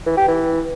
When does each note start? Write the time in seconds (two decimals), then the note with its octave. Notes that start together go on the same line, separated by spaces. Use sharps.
0.06 E3
0.17 G4
0.28 E3